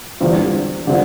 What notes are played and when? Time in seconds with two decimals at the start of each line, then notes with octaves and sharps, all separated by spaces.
0.20 E2 D3 G3 C4 F4
0.87 D3 G3 C4 F4